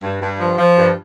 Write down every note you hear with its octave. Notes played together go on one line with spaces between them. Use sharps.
G2
G2
F3
F3
G2